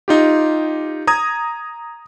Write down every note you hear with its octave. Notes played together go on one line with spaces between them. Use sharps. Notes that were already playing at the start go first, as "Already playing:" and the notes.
D#4 F4 G4
A#5 D#6 G#6